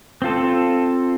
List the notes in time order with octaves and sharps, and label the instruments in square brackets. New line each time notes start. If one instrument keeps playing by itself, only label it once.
[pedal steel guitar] C4 F4 A4